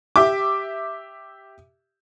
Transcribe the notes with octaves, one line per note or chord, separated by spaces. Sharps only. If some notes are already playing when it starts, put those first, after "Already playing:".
G4 E5 D6